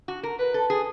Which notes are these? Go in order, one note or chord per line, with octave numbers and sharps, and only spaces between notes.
F#4
A#4
B4
A4
G#4